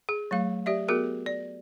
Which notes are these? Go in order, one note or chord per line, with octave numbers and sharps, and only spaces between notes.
G#4
F#3 A3 F5
G4 D5 E5
B3 F#4 G#4 A#4
D5